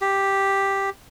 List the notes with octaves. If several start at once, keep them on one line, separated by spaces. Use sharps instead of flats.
G4